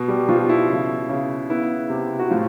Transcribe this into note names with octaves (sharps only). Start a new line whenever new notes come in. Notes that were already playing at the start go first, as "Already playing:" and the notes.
Already playing: B2
G3 G4
B2 F3 F4
E4
C#3
C#3
B3 E4
C3
F#4
A2 F3 F4